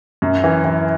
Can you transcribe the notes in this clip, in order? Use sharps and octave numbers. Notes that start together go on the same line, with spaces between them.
F#2
E3
E3